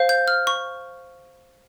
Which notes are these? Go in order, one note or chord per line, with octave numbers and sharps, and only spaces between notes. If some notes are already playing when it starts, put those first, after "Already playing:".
Already playing: C5 F5
G6
F6
C#6